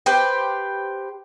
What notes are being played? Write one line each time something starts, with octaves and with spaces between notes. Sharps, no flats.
G4 B4 C5